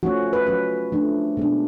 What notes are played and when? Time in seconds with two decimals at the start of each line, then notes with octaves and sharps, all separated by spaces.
0.03 F3 A3 C#4 F#4
0.33 B4
0.47 F#3 C#4 B4
0.92 F3 A3 D4
1.37 B2 G#3 D4